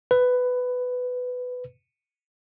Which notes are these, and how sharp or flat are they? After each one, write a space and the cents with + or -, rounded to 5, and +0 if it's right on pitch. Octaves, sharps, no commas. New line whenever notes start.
B4 +15